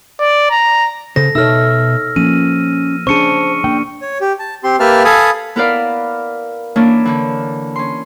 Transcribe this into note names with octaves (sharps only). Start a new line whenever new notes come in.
D5
A#5
C#3 A4 C5 A#6
B2 D#4 A4 C#5 E5 E6 F6
F3 A#3 C#4 D#7
C#4 D4 G#4 C5 A5 C#6 C#7 D#7
A#3 D4 G5
C#5
G4
A5
C4 G4 C6
A#3 G4 B4 E5 A5 F6
A4 F5 G#5 A5 B5 D#6
B3 E4 A#4 B4 D5 F5
E3 A#3 C#4 D4 E4
D3 E3
C#4 C6